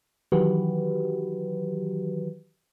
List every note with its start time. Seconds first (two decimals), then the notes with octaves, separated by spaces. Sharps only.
0.32 D#3 E3 F#3 F#4 G4 B4